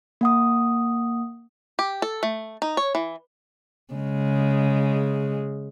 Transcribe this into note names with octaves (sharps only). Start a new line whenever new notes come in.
A#3 F#5 D#6
G4
A4
A3
D#4
C#5
E3
C#3 G#3